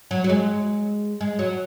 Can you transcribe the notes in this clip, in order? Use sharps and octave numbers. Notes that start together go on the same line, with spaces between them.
F#3
F#3
G#3
G#3
F#3